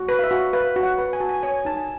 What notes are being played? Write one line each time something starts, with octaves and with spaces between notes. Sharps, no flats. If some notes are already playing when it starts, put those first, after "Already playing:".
Already playing: F#4
B4
F5
E5
F#4
B4 F5
F#4
F#5
B4
G#5
F#4 A5
G#5
C#5 G#5
D#4 A5
G#5